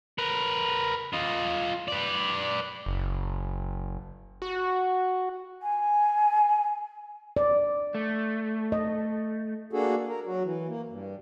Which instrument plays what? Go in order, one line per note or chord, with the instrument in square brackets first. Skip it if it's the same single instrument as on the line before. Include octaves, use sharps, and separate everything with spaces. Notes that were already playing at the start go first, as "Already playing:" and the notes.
[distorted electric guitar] A#4 B4
F4 D#5
B4 D5
[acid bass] F#1
F#4
[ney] G#5
[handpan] D5
[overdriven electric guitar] A3
[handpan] D#5
[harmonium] A#3 D4 F#4 G#4 A4
A#4
F#3 F#4
E3
A#3
G2